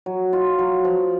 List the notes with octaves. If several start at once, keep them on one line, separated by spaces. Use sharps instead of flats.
F#3
F4
F#3
F3